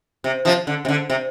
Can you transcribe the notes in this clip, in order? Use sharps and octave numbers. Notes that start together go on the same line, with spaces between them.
C3
C3 F3
D3
C3
D3
C3